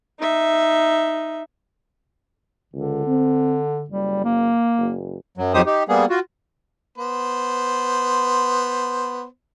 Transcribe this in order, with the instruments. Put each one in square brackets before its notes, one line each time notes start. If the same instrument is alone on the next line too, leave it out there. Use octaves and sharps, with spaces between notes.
[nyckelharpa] D#4 E5
[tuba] C#2 [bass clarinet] D3
[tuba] C4
[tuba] F#1 [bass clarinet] G3
[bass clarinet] A#3
[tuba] F#1
[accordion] F#2 F#3
F2 F#3 D#4 G4 C5 D#6
D#4 G4
G3 A#3 B3 G#4
F4 F#4
[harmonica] B3 C5